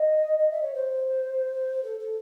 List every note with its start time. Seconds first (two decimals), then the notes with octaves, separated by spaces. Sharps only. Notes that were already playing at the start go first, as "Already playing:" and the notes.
Already playing: D#5
0.38 D#5
0.50 E5
0.62 C#5
0.74 C5
1.83 A4
1.99 A4